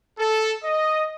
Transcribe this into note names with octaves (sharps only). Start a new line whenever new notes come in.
A4
D#5